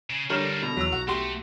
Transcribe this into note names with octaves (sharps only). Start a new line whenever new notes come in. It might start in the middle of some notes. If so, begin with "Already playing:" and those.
C#3
D3 G3 D4 D#4 A#4 C#5
B2 A#5
E2 F#3 E6
B1 F#4
A3 F#4 G4 C6